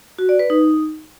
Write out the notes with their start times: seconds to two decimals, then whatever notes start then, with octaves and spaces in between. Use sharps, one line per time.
0.18 F#4
0.29 D5
0.39 B4
0.50 D#4